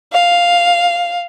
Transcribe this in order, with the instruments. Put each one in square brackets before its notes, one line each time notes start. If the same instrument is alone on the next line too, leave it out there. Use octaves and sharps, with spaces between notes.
[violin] F5